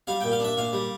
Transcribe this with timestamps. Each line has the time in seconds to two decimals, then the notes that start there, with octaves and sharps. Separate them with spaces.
0.07 G3 F5
0.20 A#2 G5
0.32 F5
0.40 D4 E5
0.57 A#2 F5
0.73 G3